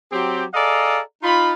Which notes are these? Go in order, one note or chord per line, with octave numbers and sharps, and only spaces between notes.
F#3 C4 G4
G#4 A4 D5 D#5 F5 A#5
D#4 F4 B5